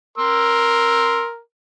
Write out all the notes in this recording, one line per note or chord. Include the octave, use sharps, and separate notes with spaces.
A#4 C6 E6